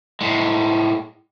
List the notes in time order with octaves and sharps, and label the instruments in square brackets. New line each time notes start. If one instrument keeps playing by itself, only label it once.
[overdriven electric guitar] A2 G#3